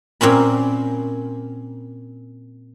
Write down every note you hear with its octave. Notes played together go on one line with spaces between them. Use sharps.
A#2 C4 C#4 B5